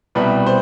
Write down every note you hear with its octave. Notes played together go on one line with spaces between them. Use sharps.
C2 B2 G3 B4
C5